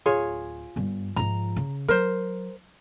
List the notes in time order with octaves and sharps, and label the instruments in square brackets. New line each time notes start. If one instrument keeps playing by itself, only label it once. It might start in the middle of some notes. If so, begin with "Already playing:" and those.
[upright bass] D1 [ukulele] F4 G#4 C#5
[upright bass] G1 G2
[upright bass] G#2 F3 [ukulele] A#5
[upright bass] C#3
[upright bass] F#3 [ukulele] A#4 C5